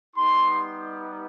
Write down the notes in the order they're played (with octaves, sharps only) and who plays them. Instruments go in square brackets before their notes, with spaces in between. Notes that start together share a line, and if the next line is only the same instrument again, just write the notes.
[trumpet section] G3 B3 D#4 G4 C6